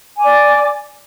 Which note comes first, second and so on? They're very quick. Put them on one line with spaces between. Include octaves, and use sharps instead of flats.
G#5 D6 D5